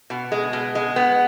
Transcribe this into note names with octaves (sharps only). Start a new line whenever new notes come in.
B2
G#3
B2
G#3
B3